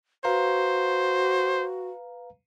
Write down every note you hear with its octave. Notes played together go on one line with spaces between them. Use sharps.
F#4 B4 C5 F5 A#5